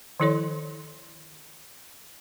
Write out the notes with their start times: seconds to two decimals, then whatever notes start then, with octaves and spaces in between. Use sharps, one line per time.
0.20 D#3 F3 E4 A4 C#5 C6